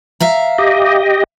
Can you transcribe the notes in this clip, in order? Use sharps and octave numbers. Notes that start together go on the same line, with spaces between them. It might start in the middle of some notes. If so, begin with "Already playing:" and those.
E5 F5 A#5
G4 D#5